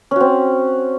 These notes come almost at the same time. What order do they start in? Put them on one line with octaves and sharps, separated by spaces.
C#4 F#4 C4